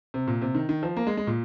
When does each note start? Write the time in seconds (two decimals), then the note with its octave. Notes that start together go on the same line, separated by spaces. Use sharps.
0.14 C3
0.27 A#2
0.41 C3
0.55 D#3
0.69 D#3
0.83 F3
0.97 A#3
1.07 G#3
1.17 G#3
1.27 A#2